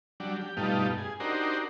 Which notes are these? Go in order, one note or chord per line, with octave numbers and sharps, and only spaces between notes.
F#3 G3 D4
G4
G2 B2 G3 A3 D#4 F4
G#4
D4 D#4 F#4 G4 A#4 C5